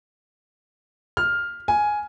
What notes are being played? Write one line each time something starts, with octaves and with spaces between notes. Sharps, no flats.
F6
G#5